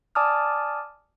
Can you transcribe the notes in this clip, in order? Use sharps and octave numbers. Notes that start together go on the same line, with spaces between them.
D5 G#5 A5 D6 D#6 F6